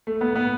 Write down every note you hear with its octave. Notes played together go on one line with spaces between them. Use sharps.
A3
B3
B3